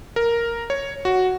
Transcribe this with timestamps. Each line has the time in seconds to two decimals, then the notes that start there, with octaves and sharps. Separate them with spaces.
0.16 A#4
0.70 C#5
1.05 F#4